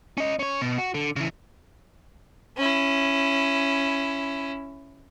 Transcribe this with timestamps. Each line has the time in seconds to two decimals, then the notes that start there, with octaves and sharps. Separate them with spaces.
0.18 C#4 D#5
0.39 C#4 C#5
0.61 B2
0.78 F#4
0.94 D3
1.16 C#3 E3
2.57 C#4 E4